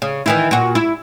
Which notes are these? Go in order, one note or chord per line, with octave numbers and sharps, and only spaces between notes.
C#3
D#3 E3 E4
A#2 F#4
E4